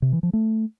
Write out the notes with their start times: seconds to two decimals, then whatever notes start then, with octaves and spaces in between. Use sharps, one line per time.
0.02 C3
0.13 E3
0.23 F3
0.33 A3